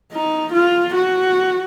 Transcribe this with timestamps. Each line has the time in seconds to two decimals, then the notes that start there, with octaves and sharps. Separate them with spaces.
0.13 D#4
0.53 F4
0.95 F#4